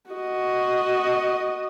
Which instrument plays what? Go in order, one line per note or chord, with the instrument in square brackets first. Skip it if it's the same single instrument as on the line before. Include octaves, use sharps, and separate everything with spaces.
[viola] F#4 D#5